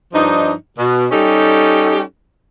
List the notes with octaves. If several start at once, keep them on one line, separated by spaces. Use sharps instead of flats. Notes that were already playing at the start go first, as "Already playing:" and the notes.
G2 F3 D4 D#4
B2
G3 C#4 D#4 G4 A4